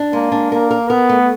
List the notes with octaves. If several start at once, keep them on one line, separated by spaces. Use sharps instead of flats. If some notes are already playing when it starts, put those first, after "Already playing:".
Already playing: D4
G#3 A#3
D4
A#3 A#4
A#4
B3 A#4
A3